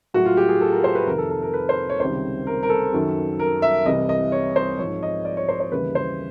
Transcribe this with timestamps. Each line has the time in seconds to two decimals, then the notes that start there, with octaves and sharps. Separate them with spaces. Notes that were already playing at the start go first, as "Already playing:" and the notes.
0.14 A2 F#3 F#4
0.26 F4
0.37 G4
0.49 G#4
0.61 A4
0.72 A#4
0.84 C5
0.95 B4
1.07 F2 C3 D#3 A#4
1.18 A4
1.30 A4
1.42 A#4
1.54 B4
1.69 C5
1.90 C#5
2.00 C#2 C3 D#3 G3 C5
2.47 A#4
2.63 A#4
2.69 A4
2.93 F#2 D#3 F#3
3.39 A#4
3.62 E5
3.85 C2 C3 E3 G3 D#5
4.09 D#5
4.32 C#5
4.56 C5
4.79 G#2 F3 C#5
5.03 D#5
5.25 D5
5.37 C#5
5.49 C5
5.60 C5
5.72 D#2 C#3 E3 G3 B4
5.95 C5